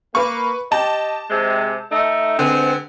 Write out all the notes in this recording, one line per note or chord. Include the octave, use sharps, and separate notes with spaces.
A#3 B4 C#6
G4 D#5 A5
C3 G#3
A3 D#4
D3 G#3 B3 C4